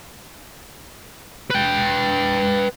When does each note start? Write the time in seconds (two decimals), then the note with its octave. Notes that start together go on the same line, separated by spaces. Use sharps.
1.50 B4 G5